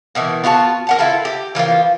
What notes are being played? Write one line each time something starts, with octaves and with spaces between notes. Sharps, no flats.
B2 D#3 E3
B3 F4 F#4 A5
A#4 F#5 A5
E4 F4 A4 B4
G4
E3 F3 A#3 F4